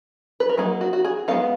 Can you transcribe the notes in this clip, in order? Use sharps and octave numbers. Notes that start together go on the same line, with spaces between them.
B4
A#4
F#3 A#3 D#4 G#4
F#4
F#4
G#4
G#3 B3 D#4 F5